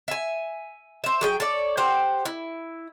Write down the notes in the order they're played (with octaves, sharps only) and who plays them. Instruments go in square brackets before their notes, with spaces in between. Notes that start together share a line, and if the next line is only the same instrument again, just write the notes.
[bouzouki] E5 G#5
C5 E5
F#3 G#4 G5
A4 C#5 D5
G4 C5 F#5 G5
E4